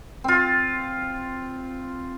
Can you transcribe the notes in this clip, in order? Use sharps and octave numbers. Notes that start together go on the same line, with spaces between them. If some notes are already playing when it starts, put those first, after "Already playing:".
C4 F4